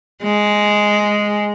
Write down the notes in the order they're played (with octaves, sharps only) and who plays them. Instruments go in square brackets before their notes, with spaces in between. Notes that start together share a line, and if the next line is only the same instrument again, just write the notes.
[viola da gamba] G#3